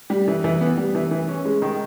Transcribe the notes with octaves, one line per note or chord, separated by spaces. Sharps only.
G3
E3
E3
B3
G3
E3
E3
C#4
G#3
D#3